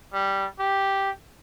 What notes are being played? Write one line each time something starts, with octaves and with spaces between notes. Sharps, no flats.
G3
G4